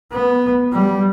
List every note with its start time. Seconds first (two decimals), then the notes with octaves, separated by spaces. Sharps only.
0.12 B3
0.73 G3